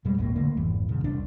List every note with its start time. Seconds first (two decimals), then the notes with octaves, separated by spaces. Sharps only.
0.05 E2 B2 G3 G#3
0.18 A#1 E2 A2 A#3
0.36 C#2 D3 A3 A#3
0.57 G#1 F2 E3
0.88 C2 A#2 C#3
1.04 E1 C2 D4